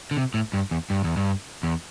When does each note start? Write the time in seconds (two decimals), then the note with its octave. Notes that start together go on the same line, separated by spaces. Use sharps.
0.11 D3
0.17 C3
0.34 A2
0.53 G2
0.71 E2
0.90 G2
1.04 E2
1.17 G2
1.63 E2